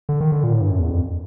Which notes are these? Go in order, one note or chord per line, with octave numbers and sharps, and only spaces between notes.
D3
D#3
D3
A#2
A2
G2
F#2
E2
F2